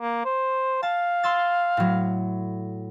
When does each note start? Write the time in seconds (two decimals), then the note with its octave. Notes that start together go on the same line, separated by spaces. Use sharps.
0.01 A#3
0.25 C5
0.83 F5 A5
1.23 C6 E6 A6
1.77 A2 F#3